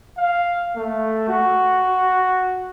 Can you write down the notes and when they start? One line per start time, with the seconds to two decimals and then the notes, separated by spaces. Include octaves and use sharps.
0.18 F5
0.77 A3
1.29 F#4